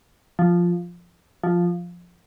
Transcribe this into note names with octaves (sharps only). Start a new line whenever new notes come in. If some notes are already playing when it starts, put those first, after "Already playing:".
F3
F3